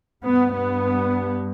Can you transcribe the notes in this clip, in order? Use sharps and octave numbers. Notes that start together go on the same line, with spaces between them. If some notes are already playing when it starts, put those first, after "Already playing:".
G2 B3
B3